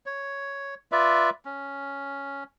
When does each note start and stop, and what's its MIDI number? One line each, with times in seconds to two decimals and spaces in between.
0.06 0.75 73
0.92 1.30 65
0.92 1.30 71
0.92 1.30 74
0.92 1.30 76
1.45 2.44 61